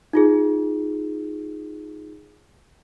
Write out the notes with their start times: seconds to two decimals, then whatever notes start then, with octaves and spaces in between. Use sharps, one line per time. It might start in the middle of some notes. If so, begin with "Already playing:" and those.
0.13 D#4 F4 G#4